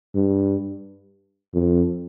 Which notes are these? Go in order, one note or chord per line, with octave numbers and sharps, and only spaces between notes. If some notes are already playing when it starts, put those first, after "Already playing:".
G2
F2